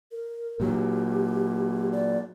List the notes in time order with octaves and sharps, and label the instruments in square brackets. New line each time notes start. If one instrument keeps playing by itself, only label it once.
[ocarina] A#4
[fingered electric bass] A#2 F#3 [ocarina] G4
[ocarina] D5